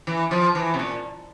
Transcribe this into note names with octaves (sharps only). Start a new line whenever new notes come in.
E3
F3
E3
C3
A#2